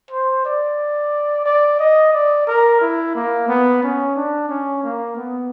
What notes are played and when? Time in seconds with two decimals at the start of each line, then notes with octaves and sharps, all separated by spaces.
0.11 C5
0.46 D5
1.46 D5
1.79 D#5
2.13 D5
2.47 A#4
2.82 E4
3.15 A#3
3.49 B3
3.83 C#4
4.16 D4
4.49 C#4
4.84 A#3
5.17 B3